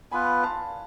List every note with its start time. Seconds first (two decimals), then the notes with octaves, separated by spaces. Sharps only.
0.12 B3 F4 B4 G#5 B5
0.43 F5 A5